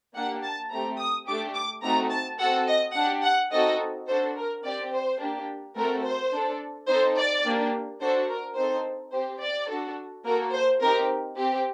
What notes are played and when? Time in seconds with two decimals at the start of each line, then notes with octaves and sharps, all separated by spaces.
0.15 A#3 D4 G4 F#5
0.43 A5
0.71 A3 C4 G4 A#5
0.99 D#6
1.26 A3 D4 G4 D6
1.55 D6
1.83 A3 C4 D#4 F#4 A#5
2.11 A5
2.39 C4 F#4 A4 F#5
2.67 D#5
2.95 D4 G4 F#5
3.23 F#5
3.51 C4 D#4 F#4 A4 D#5
4.08 D4 F#4 A4 C5
4.36 A#4
4.63 C4 G4 D5
4.92 C5
5.20 A#3 D4 G4
5.76 A3 C4 F#4 A4 A#4
6.04 C5
6.32 D4 A4
6.88 C4 D#4 A4 C5
7.16 D5
7.44 A#3 D4 G4
8.00 D4 F#4 A4 C5
8.28 A#4
8.56 C4 D#4 A4 C5
9.12 C4 G4 C5
9.41 D5
9.69 D4 F#4 A4
10.25 A#3 F#4 A4 A#4
10.53 C5
10.81 C4 D#4 G4 A#4
11.37 C4 G4